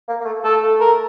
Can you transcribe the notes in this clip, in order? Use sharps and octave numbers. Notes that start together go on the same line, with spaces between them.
A#3
A#3
A3
A3 A4
A#4